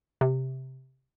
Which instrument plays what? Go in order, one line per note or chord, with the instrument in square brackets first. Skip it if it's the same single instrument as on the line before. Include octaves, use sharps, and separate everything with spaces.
[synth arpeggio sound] C3